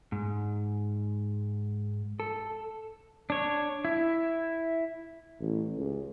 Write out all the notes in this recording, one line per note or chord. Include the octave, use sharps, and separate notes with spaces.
G#2
A4
D4 C#5
E4
A1
C#2